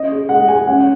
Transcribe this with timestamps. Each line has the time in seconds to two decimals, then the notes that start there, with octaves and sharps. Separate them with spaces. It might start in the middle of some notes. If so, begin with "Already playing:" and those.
Already playing: C#4 D#5
0.10 G#4
0.29 G#3 F#5
0.48 G#3 G#5
0.67 C#4 F#5